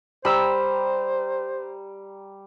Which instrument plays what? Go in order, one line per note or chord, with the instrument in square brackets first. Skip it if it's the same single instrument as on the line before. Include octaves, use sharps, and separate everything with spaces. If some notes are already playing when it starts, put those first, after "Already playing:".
[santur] G3 A#5 [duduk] C5 [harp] B5 E6